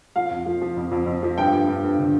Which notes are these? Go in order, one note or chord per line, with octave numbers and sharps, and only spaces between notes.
F3 F5
F2
F3
F3
F2
F2
F2
F3
G2 G5
G2
G2
G2
D3